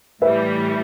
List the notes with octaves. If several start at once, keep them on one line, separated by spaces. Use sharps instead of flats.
A2 E3 G3 B4 E5